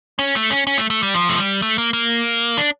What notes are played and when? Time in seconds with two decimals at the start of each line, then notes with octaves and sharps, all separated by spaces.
0.19 C#4
0.35 A3
0.50 C#4
0.67 C#4
0.78 A3
0.90 A3
1.03 G3
1.14 F3
1.29 A3
1.38 G3
1.62 A3
1.78 A#3
1.93 A#3
2.57 D4